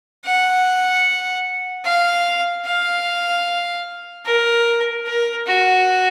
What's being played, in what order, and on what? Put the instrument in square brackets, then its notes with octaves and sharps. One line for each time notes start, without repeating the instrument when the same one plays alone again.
[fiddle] F#5
F5
F5
A#4
A#4
F#4